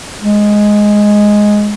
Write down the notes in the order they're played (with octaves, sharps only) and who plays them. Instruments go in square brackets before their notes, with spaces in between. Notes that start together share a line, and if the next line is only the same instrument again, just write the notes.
[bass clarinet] G#3